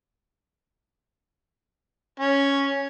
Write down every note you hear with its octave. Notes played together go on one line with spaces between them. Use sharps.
C#4